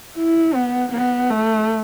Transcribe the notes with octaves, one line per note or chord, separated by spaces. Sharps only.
E4
B3
B3
A3